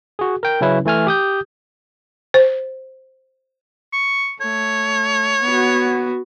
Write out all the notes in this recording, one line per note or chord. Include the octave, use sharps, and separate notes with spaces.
F#4 G#4
A#4 G5
C#3 F#3 C#4 E4 B4
E3 A3 G#5 F6
G4 D#6 G6
C5
C#6
A3 C#5
B3 F#4